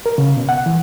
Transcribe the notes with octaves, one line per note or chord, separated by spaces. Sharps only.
A#4
C#3
B2
F#5
E3